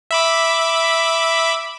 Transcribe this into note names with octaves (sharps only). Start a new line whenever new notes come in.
E5 B5 D6